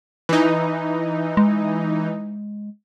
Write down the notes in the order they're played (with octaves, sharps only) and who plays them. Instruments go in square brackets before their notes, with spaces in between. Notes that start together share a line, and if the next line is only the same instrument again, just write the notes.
[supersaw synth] E3 D#4
[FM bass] G#3